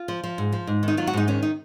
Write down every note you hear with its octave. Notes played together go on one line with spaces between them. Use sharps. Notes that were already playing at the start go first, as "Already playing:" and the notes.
Already playing: F4
F3
F3
G#2
F3
G#2
D#3
D#4
F#3 F4
F#4
G#2 D#4
D#3 C#4
D#4